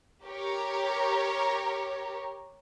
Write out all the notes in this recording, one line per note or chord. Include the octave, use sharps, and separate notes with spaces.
G4 A#4 C#5